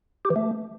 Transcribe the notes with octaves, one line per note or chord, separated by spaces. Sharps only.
G4
E3
A3